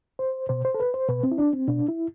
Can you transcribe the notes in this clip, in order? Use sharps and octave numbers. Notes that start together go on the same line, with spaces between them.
C5
B2 C5
C5
A4
B4
C5
B2 B4
C4
E4
D4
C4
B2 D4
E4